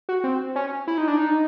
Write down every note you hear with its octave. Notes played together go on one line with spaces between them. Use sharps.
F#4
C4
C#4
E4
D#4
D4
D#4